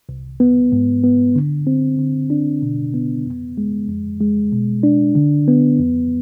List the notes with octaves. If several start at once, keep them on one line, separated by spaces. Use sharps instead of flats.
C2
B3
G#2
B3
D3
C4
D3
D4
B2
B3
F2
G#3
F2
G#3
B2
D4
D3
B3
F2